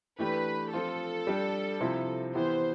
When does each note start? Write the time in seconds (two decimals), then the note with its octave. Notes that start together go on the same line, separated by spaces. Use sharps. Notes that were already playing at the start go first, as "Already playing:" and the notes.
0.19 E3 A3 D4 G4 B4
0.72 F3 C4 F4 A4
1.27 G3 D4 G4
1.80 C3 F3 C4 E4
2.34 E3 B3 E4 G4 C5